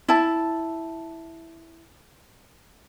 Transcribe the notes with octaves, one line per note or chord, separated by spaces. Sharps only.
E4 A5